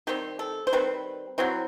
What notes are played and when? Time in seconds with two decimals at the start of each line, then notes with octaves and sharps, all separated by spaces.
0.07 D#3 G3 C4 G4
0.39 A4
0.67 C5
0.73 D#3 G3 C4 B4
1.38 F#3 C4 E4